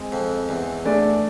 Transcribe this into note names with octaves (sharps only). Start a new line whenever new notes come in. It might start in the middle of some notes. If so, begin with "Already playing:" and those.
Already playing: G#3 C4
F2
E2
A3 D4 G#4 D5